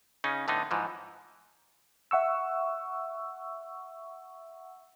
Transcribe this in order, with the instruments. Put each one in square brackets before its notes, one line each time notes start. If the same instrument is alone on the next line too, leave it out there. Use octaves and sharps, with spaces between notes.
[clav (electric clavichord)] C#3 C#4 D#4
A2 D3 B3 D#4
G#2 E3 F3
[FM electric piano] E5 F#5 C#6 E6